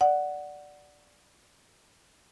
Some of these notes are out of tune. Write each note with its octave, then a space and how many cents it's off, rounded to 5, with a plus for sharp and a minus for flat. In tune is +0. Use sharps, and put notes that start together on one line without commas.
D5 +0 F#5 +0